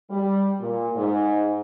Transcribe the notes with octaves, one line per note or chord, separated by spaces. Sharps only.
G3
A#2
G#2